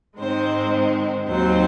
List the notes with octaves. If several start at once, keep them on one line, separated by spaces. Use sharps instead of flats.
G#2 D#3 G#3 C4 C5
D#2 D#3 F#3 C4 C5